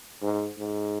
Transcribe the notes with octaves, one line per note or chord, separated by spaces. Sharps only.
G#2
G#2